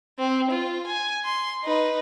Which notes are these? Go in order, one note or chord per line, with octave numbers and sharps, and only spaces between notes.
C4
F4
G#5
C6
D#4 B4